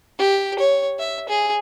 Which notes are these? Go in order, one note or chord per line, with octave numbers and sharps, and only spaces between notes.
G4
C#5
E5
G#4